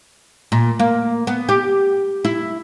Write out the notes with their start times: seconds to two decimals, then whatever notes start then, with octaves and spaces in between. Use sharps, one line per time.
0.52 A#2
0.79 A#3
1.27 B3
1.49 G4
2.25 E4